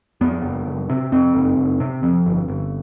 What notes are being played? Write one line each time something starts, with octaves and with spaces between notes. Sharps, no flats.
F2 B3
F#1
F#1
C3
F2 C4
F#1
F#1
C3
F2
G1
G1